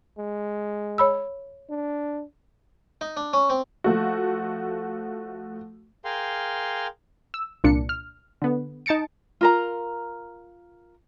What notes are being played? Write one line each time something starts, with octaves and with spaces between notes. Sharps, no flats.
G#3
C#5 B5 E6
D4
D#4
D4
C#4
C4
F3 A3 F#4
G#4 A#4 F5 G5 C6
E6
C2 A#2 D4 C#7
F6
D3 B3
D#4 A5 A6 C#7 D7
F4 A#4 A#5